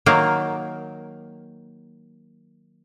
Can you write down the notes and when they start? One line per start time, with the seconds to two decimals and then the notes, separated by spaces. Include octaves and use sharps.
0.06 D#3 F#3 A#3